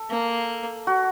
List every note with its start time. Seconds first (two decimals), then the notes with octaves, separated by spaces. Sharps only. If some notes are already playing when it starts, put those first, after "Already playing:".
Already playing: A4
0.10 A#3
0.87 F#4